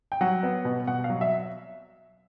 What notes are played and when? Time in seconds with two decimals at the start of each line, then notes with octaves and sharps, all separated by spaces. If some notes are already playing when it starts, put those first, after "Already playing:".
0.12 G5
0.21 F#3 F#5
0.43 B3
0.65 B2
0.87 B2 F#5
1.04 F5
1.10 F#3
1.21 E5